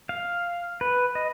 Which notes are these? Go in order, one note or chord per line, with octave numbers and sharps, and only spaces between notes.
F5
B4
D#5